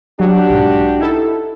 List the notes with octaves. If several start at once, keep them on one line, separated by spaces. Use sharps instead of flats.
F#3 D4 F#4 G4
B1 G#2
D#4 E4 A4